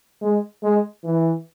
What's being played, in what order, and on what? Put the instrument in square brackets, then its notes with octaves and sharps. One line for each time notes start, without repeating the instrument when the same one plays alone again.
[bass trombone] G#3
G#3
E3